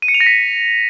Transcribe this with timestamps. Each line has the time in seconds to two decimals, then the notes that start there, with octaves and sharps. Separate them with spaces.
0.02 D#7
0.08 C#7
0.14 F7
0.20 A#6
0.26 B6